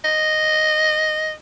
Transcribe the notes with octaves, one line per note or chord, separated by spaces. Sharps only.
D#5